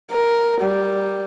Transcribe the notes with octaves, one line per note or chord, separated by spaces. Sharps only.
A#4
G3